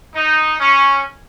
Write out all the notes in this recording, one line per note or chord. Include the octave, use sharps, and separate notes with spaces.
D#4
C#4